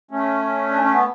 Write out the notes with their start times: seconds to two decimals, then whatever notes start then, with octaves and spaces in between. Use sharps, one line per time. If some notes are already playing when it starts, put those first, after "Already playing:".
0.11 A3 C#4
0.69 D4
0.81 C#4
0.92 B3